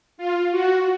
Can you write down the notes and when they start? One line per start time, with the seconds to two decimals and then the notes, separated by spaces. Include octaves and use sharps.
0.18 F4
0.51 F#4